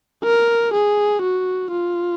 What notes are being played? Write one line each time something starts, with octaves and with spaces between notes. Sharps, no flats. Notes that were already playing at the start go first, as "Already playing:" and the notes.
A#4
G#4
F#4
F4